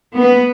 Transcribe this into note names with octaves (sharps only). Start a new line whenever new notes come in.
B3